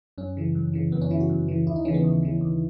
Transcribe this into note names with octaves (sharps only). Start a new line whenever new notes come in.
F#2 C#4
C#3 E3
F#2
C#3 E3
F#2 B3
C#4
C#3 E3 E4
F#4
F#2
C#3 E3
D#2 E4
D#4
C#3 E3 C#4
B3
D#2
C#3 E3
D#2